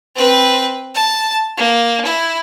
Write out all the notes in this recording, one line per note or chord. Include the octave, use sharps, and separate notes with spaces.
C4 B4
A5
A#3
E4